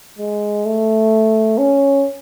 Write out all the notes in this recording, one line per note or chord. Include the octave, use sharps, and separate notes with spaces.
G#3
A3
C#4